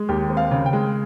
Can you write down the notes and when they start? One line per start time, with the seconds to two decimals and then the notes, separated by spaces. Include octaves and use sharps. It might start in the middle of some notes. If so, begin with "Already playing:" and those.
Already playing: G#3
0.09 D#2 G4
0.30 C4
0.37 F5
0.51 C#3
0.66 G5
0.73 G#3